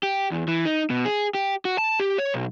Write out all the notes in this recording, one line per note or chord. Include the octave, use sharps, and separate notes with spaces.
G4
E2
E3
D#4
B2
G#4
G4
F#4
A5
G4
C#5
B1